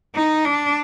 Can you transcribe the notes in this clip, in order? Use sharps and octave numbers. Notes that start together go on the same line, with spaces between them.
D#4
D4